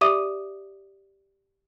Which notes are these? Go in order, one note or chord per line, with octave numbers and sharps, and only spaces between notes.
G4 D5 E5 D6 D#6 D#7